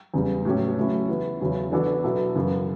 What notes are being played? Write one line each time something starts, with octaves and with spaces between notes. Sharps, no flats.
E2 C#3 G3
A2 F#3 A3 C#4 G4
C#3 F#3 A3 C#4 E4
E3 B3 E4 G4
E2 C#3 F#3 C#4 E4
E3 B3 D4 F#4 A4
B2 F#3 B3 E4 A4
F#2 C#3 E3